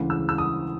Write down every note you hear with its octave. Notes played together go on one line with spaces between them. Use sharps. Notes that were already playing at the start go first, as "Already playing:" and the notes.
Already playing: D2 C#3 E3 G#3
E6
E6
D#6